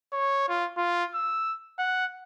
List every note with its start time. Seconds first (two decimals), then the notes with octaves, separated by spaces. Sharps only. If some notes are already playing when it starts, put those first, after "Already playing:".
0.13 C#5
0.48 F4
0.77 F4
1.14 E6
1.78 F#5